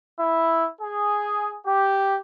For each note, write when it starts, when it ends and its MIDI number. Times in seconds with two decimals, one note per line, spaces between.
0.19 0.65 64
0.82 1.56 68
1.67 2.18 67